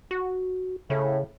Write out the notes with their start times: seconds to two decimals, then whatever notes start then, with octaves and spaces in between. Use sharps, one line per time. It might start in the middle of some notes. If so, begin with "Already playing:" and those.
0.11 F#4
0.90 A2 C#3